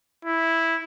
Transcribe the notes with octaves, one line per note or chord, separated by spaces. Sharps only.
E4